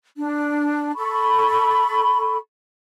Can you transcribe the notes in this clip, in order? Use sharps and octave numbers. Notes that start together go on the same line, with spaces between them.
D4
A4 B5 C#6